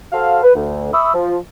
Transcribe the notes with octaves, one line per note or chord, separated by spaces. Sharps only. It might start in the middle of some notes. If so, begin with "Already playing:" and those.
F#4 A4 C5 F5
B4
D2
E5 B5 C#6 D#6 E6
F3